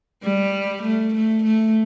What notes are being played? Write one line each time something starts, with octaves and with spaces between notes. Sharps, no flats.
G3
A3
A3
A3